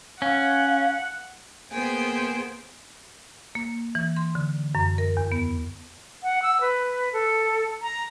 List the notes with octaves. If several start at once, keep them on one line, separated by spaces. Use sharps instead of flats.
C#4 F5 F#5
A#3 B3 G#4 C5 G5 G#5
A#3
E3
C6
D3
F#2
A#4
E2
B3
F#5
E6
B4
A4
A#5